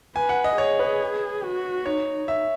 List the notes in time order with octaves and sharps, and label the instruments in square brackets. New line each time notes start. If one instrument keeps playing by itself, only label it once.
[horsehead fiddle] B4 [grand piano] G#5
[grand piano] F#5
D#5
[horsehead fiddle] G#4 [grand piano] C#5
[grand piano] B4
[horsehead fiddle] F#4
[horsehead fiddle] D#4 [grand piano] C#5
[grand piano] E5